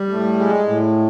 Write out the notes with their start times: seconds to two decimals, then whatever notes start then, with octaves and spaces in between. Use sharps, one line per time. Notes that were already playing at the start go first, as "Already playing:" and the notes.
Already playing: G3
0.09 A2
0.39 G#3
0.68 A2